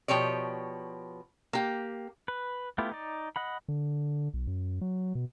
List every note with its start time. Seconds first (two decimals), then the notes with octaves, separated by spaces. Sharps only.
0.08 B2 F3 G4 C#5 D5
1.53 A#3 G4
2.28 B4
2.78 A3 B3 E4 F4 G4
2.92 D#4 D5
3.36 D#5 F#5 B5
3.68 D3
4.34 B1
4.47 F#2
4.81 F#3
5.15 B2